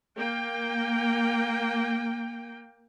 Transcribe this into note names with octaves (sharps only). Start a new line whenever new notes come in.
A#3 G5